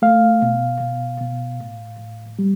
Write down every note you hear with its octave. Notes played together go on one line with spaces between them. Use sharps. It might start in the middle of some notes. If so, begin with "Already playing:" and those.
A3 F5
B2
B2
B2
A2
A2
G3